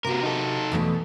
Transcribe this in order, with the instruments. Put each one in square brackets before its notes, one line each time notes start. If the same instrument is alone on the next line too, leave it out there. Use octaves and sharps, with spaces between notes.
[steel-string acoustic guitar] C3 F#4 [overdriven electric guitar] B3 A#4
[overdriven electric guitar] D#4 A4
[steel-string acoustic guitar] E2 B2 A3